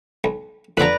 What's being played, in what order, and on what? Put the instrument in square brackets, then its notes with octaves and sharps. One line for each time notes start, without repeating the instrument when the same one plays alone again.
[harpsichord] B1
[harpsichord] F2 D3 [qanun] B4 D5 A#5